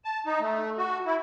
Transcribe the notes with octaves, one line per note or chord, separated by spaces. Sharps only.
A5
D#4
A3
F#4
E4